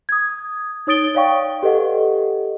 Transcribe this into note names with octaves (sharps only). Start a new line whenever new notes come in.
D#6 G#6
D#4 C#5 D#6 A6 D7 G7
C#5 D5 F5 G5 C#6
G4 A4 B4 D#5 F#5